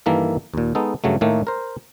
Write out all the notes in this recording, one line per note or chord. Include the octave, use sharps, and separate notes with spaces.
G2 D#3 E3 A#3 A4 E5
D#2 A#2
G#3 B3 D#4 A4
G2 C#3 F#3 A3
A2 D#3 A3 A#3
A#4 C5